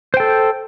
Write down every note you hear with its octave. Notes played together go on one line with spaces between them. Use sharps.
A4 C5 G5